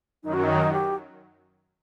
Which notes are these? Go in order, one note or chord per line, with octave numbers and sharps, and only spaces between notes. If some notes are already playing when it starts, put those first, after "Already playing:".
F#2 D#3 F#3 D#4
F#4
D#4
G4